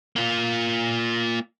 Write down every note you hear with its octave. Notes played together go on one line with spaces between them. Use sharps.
A#3 F4